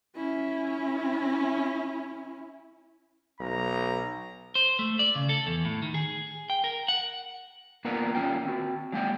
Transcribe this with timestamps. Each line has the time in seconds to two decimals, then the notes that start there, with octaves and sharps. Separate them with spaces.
0.16 C#4 E4
3.40 B1 A#5
4.55 C5
4.79 A3
4.99 D5
5.15 C#3
5.29 A4
5.47 E2
5.65 A2
5.82 D#3
5.94 G#4
6.50 G5
6.64 A#4
6.88 F#5
7.85 A#3 B3 D4 F4 A#4 F#5
8.15 A#3 C#4 F4 G5
8.46 C4 F#4
8.92 F#3 G#3 A#3 F#5 G5